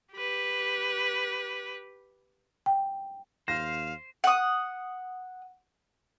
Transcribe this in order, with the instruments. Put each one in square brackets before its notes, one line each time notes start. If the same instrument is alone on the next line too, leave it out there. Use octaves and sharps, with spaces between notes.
[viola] G4 B4
[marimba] G5
[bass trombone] D#2 [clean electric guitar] C5 [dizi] F5 [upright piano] A#6
[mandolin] F#5 D#6